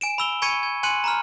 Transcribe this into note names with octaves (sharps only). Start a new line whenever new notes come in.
G#5 D7 E7
B5 E6 G7
G#5 B5 C#6 G#6 C#7 D#7
G#6
G#5 C6 F#6 C#7 D#7 F#7
A#5 B5 F6